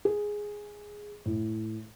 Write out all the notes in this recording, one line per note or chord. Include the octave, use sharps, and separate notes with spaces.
G#4
A2